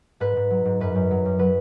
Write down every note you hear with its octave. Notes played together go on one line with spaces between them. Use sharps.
G#2 B4
G#2
F#3
G#2
F#2 B4
F#2
F#3
F#2
F#3 B4